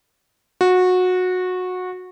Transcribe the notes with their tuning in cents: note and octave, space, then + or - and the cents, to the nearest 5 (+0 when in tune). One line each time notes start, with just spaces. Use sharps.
F#4 -20